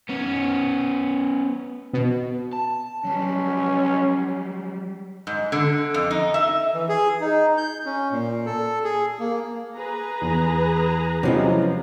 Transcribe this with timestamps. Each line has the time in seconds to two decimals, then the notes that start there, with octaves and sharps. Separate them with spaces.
0.09 B3 C#4
1.93 B2
2.53 A5
3.05 F#3 G3 C#4
5.27 G#2
5.52 D3
5.94 F2
6.11 D#4
6.34 E5
6.74 E3
6.89 G#4
7.21 D#4
7.57 G6
7.86 C#4
8.12 A#2
8.46 A4
8.84 G#4
9.20 A#3
9.77 G#4 B4 A#5
10.21 E2
11.23 C3 F3 F#3 G#3 C#4 E4